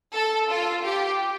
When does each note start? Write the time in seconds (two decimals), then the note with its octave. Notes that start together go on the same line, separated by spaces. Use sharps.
0.14 A4
0.49 F4
0.84 G4